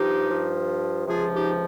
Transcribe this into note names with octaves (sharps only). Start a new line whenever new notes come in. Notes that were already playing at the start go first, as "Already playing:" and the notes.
Already playing: G2 F3 D#4 G4
G2 F3
C#2 C3 F3 F4 G#4
D#4 G4